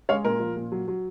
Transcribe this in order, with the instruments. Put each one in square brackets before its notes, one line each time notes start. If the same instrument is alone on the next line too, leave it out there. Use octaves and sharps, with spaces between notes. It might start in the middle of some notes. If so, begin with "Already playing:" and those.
[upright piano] G#3 C#5 F5
A#2 A#4
F3
A#2
F#3
F#3